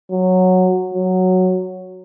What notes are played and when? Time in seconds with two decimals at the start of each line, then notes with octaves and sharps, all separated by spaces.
0.11 F#3
0.94 F#3